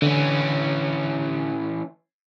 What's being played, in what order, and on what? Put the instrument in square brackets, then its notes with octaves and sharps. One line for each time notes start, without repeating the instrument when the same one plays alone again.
[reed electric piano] D3 [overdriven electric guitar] E3 C#4